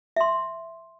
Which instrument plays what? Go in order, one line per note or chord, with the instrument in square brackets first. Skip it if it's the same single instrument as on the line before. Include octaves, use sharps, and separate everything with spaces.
[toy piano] E5 C6